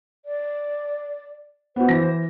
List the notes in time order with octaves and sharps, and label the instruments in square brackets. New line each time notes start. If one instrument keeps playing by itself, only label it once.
[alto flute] D5
[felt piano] B3 F#4 [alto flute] C5
[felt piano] E3 A#6